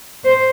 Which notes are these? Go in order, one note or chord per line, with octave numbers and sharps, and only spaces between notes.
C5